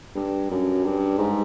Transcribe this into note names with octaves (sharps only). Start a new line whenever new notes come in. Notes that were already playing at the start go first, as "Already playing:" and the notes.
G2
F#2
G2
G#2